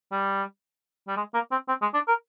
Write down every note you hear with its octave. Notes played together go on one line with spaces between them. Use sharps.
G3
G3
G#3
A#3
C4
C4
G#3
D4
A#4